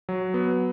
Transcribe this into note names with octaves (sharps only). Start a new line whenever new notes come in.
F#3
B3